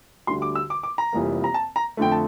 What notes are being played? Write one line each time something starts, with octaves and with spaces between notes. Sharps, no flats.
D2 D3 G3 C6
D6
E6
D6
D6
A#5
F1 F2 E3 G3 A#3
A#5
A5
A#5
F2 D3 A3 G5
A5